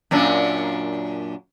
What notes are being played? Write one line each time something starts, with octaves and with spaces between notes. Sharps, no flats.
F#2 A#2 D4